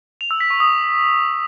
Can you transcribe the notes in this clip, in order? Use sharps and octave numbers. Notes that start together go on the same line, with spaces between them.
F7
E6
B6
C#6
D#6